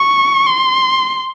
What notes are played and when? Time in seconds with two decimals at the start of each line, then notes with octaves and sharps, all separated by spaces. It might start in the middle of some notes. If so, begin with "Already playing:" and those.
Already playing: C#6
0.46 C6